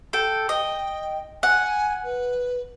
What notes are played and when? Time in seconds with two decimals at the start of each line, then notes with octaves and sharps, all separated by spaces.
0.13 A4 G5
0.49 D#5 G5
1.43 F#5 G#5
2.04 B4